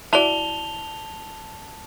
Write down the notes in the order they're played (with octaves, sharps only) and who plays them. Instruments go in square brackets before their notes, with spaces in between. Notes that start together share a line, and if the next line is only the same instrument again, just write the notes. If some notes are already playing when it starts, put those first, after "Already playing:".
[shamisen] E4 F#4 D5 [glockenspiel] A5 F7 G7